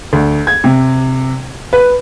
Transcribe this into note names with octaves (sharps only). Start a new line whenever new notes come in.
D2
G#6
C3
B4